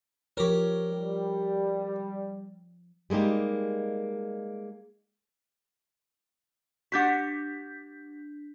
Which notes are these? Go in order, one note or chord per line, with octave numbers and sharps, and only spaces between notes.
F3 G4 A#4 C#5
G3
G3 G#3 A#3 D#4 G4
D4 F#4 G4 F#5 G6 B6